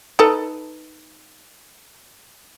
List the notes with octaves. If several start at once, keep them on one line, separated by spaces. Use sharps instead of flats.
D#4 A4 B4